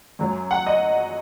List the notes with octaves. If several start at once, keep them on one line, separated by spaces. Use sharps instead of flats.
F#2 F#3
F#5
D#5